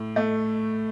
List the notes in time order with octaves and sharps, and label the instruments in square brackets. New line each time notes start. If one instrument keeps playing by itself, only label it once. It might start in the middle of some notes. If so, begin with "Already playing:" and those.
Already playing: [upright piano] A2
A3